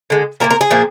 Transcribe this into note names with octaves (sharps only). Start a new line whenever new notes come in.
D3 G#3
A#2 F3 A#3 A#4
A#4
G#4
A#2 F3 A#3